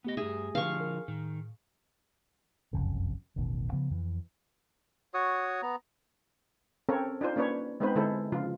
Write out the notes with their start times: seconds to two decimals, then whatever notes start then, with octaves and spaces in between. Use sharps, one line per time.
0.04 A3 B3 G4 D#5 A#6
0.17 G2 G#4 E5
0.55 D3 F3 F5 C#6
0.80 A#4
1.08 A2 D#3
2.73 F#1 C2 F2 C#3
3.36 E1 A1 B2 D#3
3.72 C#3 F3 B3
3.90 F2 E3
5.14 F#4 C#5 D#6
5.62 B3 A#5
6.89 C4 C#4 A4 A#4 C#5
7.21 D4 D#4 F4 C5
7.36 A#3 C#4 D4 B4 C#5
7.80 G#3 B3 C4 D#4 B4 C5
7.95 D3 G#3 E4 A4 C5
8.32 C#3 F3 F4